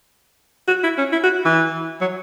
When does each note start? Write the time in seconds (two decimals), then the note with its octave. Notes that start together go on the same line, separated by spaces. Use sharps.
0.68 F#4
0.84 E4
0.98 C#4
1.13 E4
1.23 F#4
1.45 E3
2.01 F#3